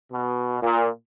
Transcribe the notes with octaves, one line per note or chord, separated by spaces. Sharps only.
B2
A#2